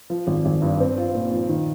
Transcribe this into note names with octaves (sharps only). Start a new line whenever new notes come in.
F3
G#1
G#1
G2
C4
F4
A#2
F3
D#3